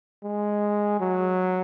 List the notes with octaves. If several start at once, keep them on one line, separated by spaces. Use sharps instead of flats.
G#3
F#3